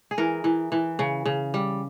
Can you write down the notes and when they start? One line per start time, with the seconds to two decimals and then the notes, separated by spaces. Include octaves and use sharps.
0.11 G#4
0.18 E3 A#4
0.44 E3
0.72 E3
0.99 C#3
1.26 C#3
1.54 G3